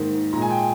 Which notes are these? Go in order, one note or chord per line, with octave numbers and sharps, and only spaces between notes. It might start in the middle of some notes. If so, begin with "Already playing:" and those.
Already playing: G#2 D#3 A#3
A#2 G#3 G#5 A#5
G5